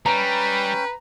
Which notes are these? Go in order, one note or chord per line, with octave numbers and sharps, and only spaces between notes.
G3 C#4 B4 G5 A#5